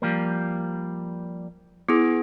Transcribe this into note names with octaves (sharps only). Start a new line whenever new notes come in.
F3 G3 A#3
B3 E4 G#4